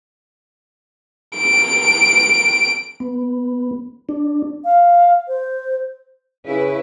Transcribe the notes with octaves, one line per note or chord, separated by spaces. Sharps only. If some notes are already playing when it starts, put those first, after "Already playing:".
D7
B3
D4
F5
C5
C#3 E4 B4